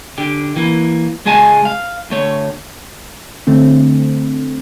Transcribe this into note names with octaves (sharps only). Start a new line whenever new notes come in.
D3 G4
E3 A#3
C#2 G#3 G#4 D#5 G#5 A5
F5
D2 A3 C#5
D3 A3 C4